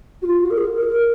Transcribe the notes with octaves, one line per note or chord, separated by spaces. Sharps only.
F#4
F4
F#4
A#4
G#4
A#4
A#4